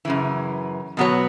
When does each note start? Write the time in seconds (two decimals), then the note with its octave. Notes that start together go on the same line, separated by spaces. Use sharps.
0.05 F#2 C#3 E3
0.97 B2 F#3 B3 F#4 C#5